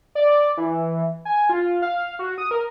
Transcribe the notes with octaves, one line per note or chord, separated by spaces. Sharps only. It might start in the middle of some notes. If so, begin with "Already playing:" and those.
D5
E3
G#5
F4
F5
F#4
D#6
A#4